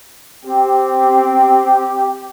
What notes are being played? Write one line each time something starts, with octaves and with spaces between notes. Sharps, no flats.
C4 G4